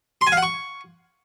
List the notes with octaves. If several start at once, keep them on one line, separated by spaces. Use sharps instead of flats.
C6
G#5
F5
F#5
C#6